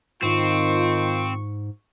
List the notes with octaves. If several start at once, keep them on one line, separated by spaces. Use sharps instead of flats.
G#2 D#3 C4 F4 C#6